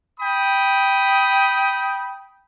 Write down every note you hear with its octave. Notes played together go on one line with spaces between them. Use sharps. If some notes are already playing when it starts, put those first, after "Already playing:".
G5 B5 D#6